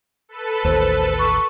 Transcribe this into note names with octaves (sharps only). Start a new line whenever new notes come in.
A4 B4
A1 D#2 C5
C#6